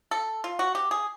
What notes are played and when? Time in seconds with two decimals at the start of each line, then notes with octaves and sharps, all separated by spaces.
0.11 A4
0.44 F4
0.59 F#4
0.75 G4
0.91 G#4